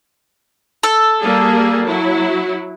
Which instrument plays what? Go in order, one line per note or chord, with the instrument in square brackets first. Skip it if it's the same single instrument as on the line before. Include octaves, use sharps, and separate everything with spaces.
[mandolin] A4
[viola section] G3 A#3 G#4
F#3 E4